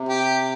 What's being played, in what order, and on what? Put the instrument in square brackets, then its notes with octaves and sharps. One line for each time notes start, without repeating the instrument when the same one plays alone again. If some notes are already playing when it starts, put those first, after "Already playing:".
Already playing: [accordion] C3
[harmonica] G4